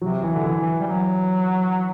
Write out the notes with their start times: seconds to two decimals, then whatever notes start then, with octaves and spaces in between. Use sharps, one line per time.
0.02 C3 F#3
0.23 E3
0.30 D3
0.44 E3
0.58 E3
0.80 G3
0.87 F#3